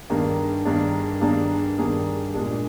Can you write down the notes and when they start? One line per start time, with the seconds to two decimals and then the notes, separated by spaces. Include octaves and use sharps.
0.10 G2 D#3 A#3 D4 G#4
0.65 G2 D#3 A#3 D4 G#4
1.21 G2 D#3 A#3 D4 G#4
1.78 G2 D#3 A#3 D4 G#4
2.34 A#2 G#3 D4 G#4